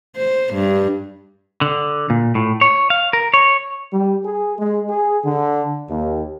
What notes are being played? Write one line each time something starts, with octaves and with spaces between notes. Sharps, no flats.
C5
G2
D3
A#2
A2
C#5
F5
A#4
C#5
G3
G#4
G#3
G#4
D3
D#2